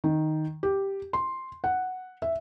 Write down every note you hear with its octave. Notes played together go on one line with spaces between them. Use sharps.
D#3
G4
C6
F#5
E5